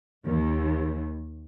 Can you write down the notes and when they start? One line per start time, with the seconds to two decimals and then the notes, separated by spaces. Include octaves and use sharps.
0.25 D#2